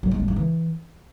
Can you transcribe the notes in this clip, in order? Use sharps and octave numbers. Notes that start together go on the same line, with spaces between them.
F#3
G#3
D4
G#3
E3